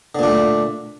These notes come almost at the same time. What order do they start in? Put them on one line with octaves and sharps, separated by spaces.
D3 A#2 D4 A3